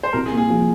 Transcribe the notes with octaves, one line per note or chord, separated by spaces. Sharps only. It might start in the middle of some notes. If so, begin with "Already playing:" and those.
C5
C2 A#4
G#4
A#2
G#4
F3